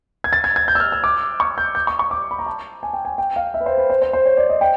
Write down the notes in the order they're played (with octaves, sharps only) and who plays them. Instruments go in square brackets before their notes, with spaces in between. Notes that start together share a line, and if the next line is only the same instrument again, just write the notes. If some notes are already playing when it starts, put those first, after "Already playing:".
[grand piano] G#6
A6
G#6
G#6
G6
E6
F6
E6
D6
C#6
G6
G6
C#6
C#6
D6
B5
A#5
A5
G#5
G5
G#5
G5
F5
E5
B4
C5
B4
C5
C5
C5
C#5
D5
D#5
G5